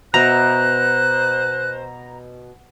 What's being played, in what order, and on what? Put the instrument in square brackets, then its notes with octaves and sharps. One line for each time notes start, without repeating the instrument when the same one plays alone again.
[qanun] B2 B4 E5 [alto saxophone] C5 [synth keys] A#5 [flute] F#6